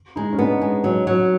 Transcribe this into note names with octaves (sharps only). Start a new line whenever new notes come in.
G#3 D#4
C#4
B3 D4
G#3
F#3
F#3